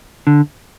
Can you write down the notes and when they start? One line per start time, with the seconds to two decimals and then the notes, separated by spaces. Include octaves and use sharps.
0.27 D3